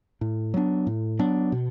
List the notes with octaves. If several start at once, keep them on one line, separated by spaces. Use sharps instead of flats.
A2
F#3 B3 D4
A2
F#3 B3 D4
B2